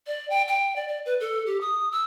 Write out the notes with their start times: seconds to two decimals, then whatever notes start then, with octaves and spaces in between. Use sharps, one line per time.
0.07 D5
0.30 G5
0.48 G5
0.76 D5
0.88 D5
1.06 B4
1.20 A4
1.46 G4
1.61 D#6
1.92 E6